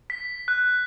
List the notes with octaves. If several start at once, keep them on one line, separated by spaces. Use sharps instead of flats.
B6
F#6